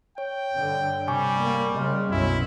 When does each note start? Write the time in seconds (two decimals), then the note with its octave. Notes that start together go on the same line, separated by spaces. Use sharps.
0.18 C#5 G5
0.53 G2 D3
1.08 C3 G3 G#5 C#6 D6
1.41 A#3
1.76 C#3 G3 D#5 C6 F6
2.11 B1 F#2 C#4 E4